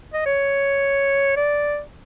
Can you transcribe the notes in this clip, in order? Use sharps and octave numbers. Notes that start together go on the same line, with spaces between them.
D#5
C#5
D5